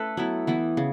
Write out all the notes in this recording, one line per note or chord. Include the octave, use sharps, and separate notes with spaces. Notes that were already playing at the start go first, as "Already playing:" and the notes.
Already playing: A3 C#4 A4 B4
F#3 B3 E4
E3 B3 E4
C#3